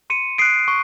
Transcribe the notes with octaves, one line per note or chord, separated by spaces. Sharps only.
C6 C#7 D#7
D#6 F#6 C7 D7
C#6